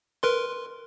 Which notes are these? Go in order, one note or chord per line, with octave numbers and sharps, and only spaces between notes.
A#4 B4 C6